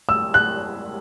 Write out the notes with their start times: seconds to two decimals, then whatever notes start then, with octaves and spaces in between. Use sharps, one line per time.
0.09 E6
0.34 F#6